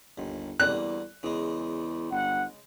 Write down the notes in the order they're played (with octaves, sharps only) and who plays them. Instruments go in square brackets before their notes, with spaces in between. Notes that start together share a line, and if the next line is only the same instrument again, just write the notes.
[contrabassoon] G1 [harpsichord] D#2
[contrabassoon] E2 [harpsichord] D3 G3 A#3 [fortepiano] F#6
[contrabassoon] E2 [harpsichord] C#3 G#3
[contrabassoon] G1 [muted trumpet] F#5